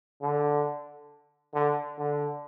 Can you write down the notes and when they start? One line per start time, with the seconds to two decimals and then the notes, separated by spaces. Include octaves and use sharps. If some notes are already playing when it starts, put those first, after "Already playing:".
0.22 D3
1.54 D3
1.99 D3